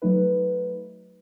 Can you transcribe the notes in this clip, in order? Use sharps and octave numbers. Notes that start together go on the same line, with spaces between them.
F#3 A3 D#4 B4